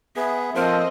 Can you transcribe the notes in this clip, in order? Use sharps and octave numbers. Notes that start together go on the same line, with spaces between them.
B3 G#4 E5
F3 C4 A4 A#4 C5 D#5